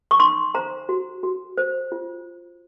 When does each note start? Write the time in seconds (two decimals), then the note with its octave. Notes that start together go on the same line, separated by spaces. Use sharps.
0.11 C#6
0.20 D#4 C6
0.55 C5 A#5
0.89 F#4
1.23 F#4
1.58 C5
1.92 F4